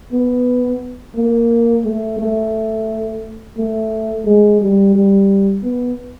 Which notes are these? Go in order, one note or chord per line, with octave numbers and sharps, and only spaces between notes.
B3
A#3
A3
A3
A3
G#3
G3
G3
B3